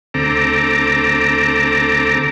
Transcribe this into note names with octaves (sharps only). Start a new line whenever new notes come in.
D2 C4 A4 A#5 D6